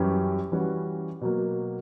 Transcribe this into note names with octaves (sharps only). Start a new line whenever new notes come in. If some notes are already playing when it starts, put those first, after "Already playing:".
Already playing: F#2 E3 G3 C#4 G4
E3 G3 C#4 F#4
B2 F#3 A#3